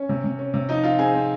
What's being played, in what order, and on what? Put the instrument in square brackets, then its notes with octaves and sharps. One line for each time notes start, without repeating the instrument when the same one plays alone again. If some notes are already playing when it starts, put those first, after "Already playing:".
Already playing: [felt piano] C#4 C#5
C3
C3
C#4
C3
F3 D#4 D#5
C4 F4 F5
C4 G#4 G#5
C4